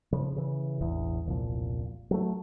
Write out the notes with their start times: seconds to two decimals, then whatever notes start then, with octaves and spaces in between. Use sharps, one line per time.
0.13 C#3 F3
0.36 C#3 E3
0.80 E1 A1 E2
1.26 E1 C2 A#2 F3
2.11 F#3 A3